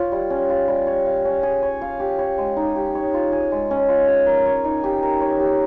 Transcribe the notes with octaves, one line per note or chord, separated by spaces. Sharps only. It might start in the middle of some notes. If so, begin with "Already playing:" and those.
Already playing: F4 C#5 F5
G3
C#4
F4
G3
C#5
F5
C#4
G#4
C#5
F5
G4
C#5
G#3
D#4
G4
C#5
F4
G#4
G#3
C#4
F4
G#4
A#4
C#5
D#4
G4
A#4
C#5
G4